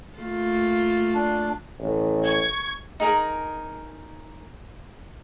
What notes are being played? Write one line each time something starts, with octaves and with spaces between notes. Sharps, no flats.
A3 A#3 F4
D4
A1
C#6 G#6
D#4 G#4 A#4 A#5